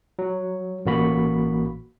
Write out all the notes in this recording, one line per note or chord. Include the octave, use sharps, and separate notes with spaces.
F#3
A1 A#3 F#4 B5